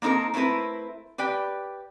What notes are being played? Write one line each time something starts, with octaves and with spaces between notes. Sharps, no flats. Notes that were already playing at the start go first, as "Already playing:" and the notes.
A#3 C4 D#4 A4 A#4
A3 C4 E4 A#4 B4
G4 B4 D5 G5